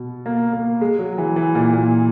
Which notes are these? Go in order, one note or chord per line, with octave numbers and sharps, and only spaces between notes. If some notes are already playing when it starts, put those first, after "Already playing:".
Already playing: B2
A#3
A#3
G#3
F#3
E3
E3
A#2
A#2